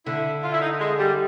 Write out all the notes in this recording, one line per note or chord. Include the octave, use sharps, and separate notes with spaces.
D3 E4
F4
E4
D#4
G#3
G3